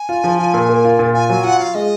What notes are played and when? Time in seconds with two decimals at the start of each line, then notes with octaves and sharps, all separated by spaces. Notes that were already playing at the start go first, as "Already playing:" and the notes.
Already playing: G#5
0.09 F4
0.24 F3
0.39 F4
0.54 A#2
0.69 A#3
0.85 F4
0.99 A#2
1.14 F4 G#5
1.29 F#3 G#5
1.44 F4 F#5
1.59 F4 F5
1.74 G#3 D#5